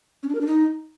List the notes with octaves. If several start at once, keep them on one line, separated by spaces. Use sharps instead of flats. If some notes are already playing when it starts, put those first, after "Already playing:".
C#4
D4
A#4
D4
D#4